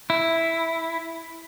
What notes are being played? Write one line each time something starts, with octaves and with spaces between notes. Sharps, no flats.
E4